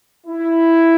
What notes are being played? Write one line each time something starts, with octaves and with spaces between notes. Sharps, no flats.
E4